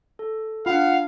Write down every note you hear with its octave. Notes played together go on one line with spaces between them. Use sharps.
A4
D4 F4 F5 F#5 B5